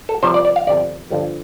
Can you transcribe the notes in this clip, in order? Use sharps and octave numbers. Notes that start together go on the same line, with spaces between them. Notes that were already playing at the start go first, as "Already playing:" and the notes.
A4
C2 C3 F3 C5
D5
D5
F5
G1 F2 C3 D5
G1 G2 D3 F3